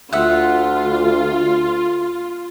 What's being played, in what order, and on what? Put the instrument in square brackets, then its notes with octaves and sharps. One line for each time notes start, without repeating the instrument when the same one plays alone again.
[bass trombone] D2 [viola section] F4 [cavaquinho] E5 F#5